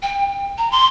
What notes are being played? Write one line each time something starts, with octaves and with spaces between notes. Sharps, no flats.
G5
A#5
C6